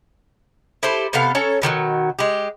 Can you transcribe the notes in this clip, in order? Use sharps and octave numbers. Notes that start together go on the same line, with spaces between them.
E4 G4 A4 C5
C3 B3 A4 F5
C#4 A4 C#5 A#5
B2 D#3 F3 F#3
G#3 G4